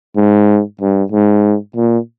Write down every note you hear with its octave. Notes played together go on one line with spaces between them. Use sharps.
G#2
G2
G#2
A#2